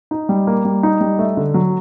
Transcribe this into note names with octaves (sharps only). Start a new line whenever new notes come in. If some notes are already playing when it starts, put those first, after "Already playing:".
D#4
G3
A#3
G3
D#4
G3
A3
D3
F#3